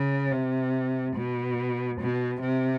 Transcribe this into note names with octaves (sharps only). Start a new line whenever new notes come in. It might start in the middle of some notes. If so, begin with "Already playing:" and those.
Already playing: C#3
C3
B2
B2
C3